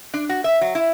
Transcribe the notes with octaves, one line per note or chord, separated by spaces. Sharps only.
D4
F#4
E5
F#3
E4